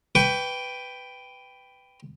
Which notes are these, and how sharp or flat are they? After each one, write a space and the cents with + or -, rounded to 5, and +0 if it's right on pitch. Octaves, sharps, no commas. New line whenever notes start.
B4 +10 G5 +0 C#6 +45